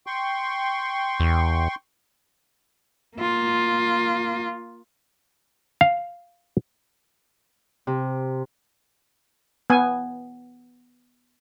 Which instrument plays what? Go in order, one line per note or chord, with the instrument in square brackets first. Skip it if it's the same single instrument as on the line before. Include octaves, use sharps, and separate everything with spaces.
[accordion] G5 C6 C#6
[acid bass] E2
[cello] A#3 F4
[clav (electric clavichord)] F5
[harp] C3
[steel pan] B3 G#5